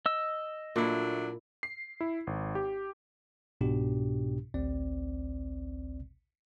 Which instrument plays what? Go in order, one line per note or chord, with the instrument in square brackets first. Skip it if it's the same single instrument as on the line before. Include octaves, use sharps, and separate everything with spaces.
[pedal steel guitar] D#5 E6
[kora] A#2 E4 [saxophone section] F#3 A3 D4
[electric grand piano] C7
E4
G#1
G4
[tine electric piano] C2 G#2 B2 D4 G4
A1 D2 C4 D5